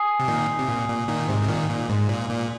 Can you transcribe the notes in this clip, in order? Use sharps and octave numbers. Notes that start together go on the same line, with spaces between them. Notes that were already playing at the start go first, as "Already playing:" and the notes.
Already playing: G#5 D#6 C7
C3
A#2 D#3
C3
A#2
A#2
A#2 D#3
G#2 C3
C3
A#2 D#3
A#2
G#2
A#2
A#2